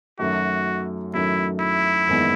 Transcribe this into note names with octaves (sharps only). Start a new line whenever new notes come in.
F#2 D#3 F#3 A3 F#4
F#2 D#3 F#3 A3 E4
E4
F#1 E2 D#3 G#3 B3